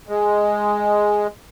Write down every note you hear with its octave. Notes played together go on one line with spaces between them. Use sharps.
G#3